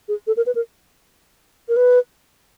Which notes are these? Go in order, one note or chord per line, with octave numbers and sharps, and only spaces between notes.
G#4
A4
A#4
B4
A#4
A#4
B4